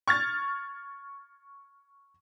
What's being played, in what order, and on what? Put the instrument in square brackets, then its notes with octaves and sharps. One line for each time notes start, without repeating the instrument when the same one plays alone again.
[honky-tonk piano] C#6 F6 G#6 A6